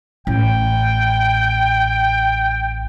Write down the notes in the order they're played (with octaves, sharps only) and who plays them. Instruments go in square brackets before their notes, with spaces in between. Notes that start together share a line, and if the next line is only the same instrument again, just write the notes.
[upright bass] A1 [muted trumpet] G5